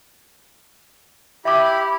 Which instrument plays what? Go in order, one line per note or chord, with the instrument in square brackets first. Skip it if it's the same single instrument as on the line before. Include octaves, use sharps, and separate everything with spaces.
[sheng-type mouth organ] E4 G4 B5 [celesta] E5 D6